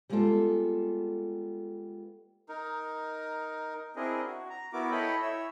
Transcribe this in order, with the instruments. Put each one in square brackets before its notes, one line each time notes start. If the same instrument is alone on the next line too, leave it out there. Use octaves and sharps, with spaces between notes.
[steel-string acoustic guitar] G3 G#3 A#3 B3 F4 A4
[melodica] D#4 A#4
[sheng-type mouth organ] C4 D4 E4 G#4 A#4 D#5
F#4
A#5
B3 E4 F#4 A#4 D6
E4 A4 C#5 D#5 G5 B5
E4 C#5 E5 E6